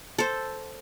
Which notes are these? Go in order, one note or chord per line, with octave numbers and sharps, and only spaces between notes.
A4 C5